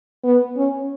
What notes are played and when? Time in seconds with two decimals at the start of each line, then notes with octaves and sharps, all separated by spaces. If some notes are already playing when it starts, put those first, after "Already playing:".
0.24 B3
0.58 C#4